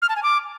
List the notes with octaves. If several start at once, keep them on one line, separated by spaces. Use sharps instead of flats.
F6
A5
G#5
D6